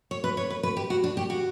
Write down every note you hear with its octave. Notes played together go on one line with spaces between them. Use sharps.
C#5
B4
C#5
B4
B4
G4
F#4
D4
G4
F#4